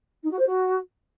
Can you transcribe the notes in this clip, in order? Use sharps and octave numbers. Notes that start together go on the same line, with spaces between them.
D#4
F#4
C5
F#4